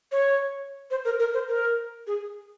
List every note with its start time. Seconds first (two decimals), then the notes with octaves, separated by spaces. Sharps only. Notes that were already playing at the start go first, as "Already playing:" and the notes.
0.12 C#5
0.91 C5
1.05 A#4
1.20 A#4
1.34 C5
1.48 A#4
2.07 G#4